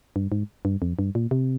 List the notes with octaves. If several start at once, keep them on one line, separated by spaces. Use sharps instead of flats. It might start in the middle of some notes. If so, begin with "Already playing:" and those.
G2
G#2
G2
F2
G2
A#2
C3